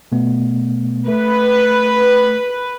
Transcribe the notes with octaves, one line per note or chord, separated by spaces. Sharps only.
B2 A3 B3
A3 B4